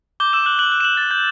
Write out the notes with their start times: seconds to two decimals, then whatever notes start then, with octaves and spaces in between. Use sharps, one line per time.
0.20 D6 G6 G7
0.33 E6 E7
0.45 D6 F#6 F#7
0.59 F#6 F#7
0.72 F#6
0.80 E7
0.84 F#6 F#7
0.97 F#6 A6
1.11 G6